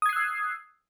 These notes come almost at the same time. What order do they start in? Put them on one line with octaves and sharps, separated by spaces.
D#6 G#6 C7 F#6 E6